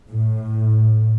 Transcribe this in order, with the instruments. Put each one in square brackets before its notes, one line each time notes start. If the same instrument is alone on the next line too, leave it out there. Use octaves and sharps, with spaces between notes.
[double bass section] A2